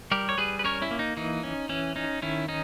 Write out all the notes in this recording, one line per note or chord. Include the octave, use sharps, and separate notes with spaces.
G3 G4 A#4
C#5
G3 G#4 B4
B4
C#4 A#4 C#5
C#4 E4
A#3
D#4
E3 D#4
C#4
E3 C#4
C#4 D#4
D#3 C#4 E4
C#4 D#4